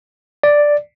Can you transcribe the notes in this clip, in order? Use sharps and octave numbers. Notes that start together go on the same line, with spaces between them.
D5